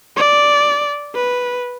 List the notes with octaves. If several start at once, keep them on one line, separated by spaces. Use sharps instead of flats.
D5
B4